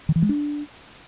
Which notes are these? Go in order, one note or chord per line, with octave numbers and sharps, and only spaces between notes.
D#3
E3
G#3
D4